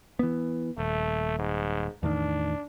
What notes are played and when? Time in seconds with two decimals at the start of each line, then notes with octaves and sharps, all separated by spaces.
0.19 E3 B3
0.78 D#1 A3
1.39 G#2
2.03 E2 A2 D#3 D4